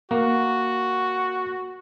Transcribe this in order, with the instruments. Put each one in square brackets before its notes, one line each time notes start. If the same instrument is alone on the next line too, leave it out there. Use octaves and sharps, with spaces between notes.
[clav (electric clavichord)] A#3 [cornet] F#4